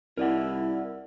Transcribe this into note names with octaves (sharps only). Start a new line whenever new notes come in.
C2 E4 A#4 D5 F#5